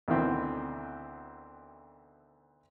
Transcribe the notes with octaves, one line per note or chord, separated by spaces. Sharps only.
D2 B2 D#3 E3 C4